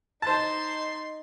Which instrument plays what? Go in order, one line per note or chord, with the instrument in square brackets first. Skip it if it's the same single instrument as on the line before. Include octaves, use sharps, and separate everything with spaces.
[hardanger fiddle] D#4 C6 [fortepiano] C5 A5